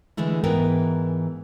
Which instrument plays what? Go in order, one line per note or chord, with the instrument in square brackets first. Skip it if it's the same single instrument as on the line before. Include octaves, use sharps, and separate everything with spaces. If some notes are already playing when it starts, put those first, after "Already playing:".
[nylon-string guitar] D3 E3 G#3 A3 E4
G#2 E3 B3 A#4 G5